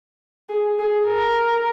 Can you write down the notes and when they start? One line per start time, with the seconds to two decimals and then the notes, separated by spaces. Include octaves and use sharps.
0.49 G#4
0.79 G#4
1.06 A#4